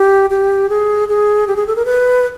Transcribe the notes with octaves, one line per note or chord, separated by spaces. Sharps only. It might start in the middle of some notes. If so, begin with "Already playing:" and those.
Already playing: G4
G4
G#4
G#4
G4
G#4
A4
A#4
B4